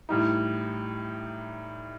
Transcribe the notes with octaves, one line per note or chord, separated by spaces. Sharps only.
A2 E3 G3 D#4